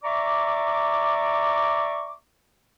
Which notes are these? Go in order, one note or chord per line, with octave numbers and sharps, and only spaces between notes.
D5 E5 A#5 C#6 D6